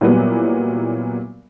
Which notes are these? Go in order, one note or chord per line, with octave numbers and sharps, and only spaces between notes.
A#2 E3 F#3 G3 B3